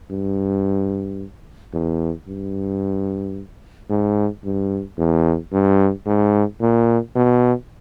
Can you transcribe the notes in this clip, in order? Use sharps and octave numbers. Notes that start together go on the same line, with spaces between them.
G2
E2
G2
G#2
G2
E2
G2
G#2
A#2
B2